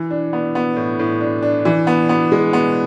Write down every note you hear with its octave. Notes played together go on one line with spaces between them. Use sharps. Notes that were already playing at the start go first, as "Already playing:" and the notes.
Already playing: E3
D4
B3
B3
A2
A2
D4
D4
E3
B3
B3
G#3
B3